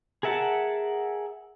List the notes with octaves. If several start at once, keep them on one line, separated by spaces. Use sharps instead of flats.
G#4 A#4 E5 F#5 A5